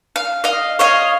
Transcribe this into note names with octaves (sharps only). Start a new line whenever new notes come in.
F5
D#5 F5
C#5 D#5 F5